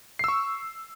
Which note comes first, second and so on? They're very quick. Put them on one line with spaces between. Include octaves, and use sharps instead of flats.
C7 E6 C#6